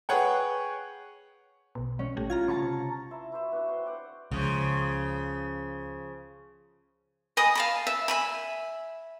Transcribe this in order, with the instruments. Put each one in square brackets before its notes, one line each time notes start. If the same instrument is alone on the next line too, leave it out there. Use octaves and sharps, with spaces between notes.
[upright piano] G#4 B4 C#5 F#5 G5
[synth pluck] B1 B2
[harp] C#4
[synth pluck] A1 A3 G4
[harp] F4 [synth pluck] A#5 F6 G#6
[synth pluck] C#3 [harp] A5 A#5 C#6
[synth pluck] C3
[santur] E4 E5 C6
E4 F#4 C5 E5
B3 D4 F#4
C4 C#5 F5 C6
D5 F#5 G5
[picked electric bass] C#2 [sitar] C#3 F3
[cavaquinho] D#5 G#5 B5 D#6
F5 A5 B5
E5
E5 G#5 B5